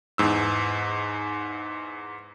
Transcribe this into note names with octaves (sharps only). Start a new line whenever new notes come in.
E2 G#2 E6